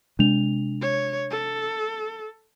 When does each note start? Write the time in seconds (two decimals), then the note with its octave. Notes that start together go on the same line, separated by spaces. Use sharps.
0.19 C3 G#3 D4 F7
0.81 C#5
1.31 A4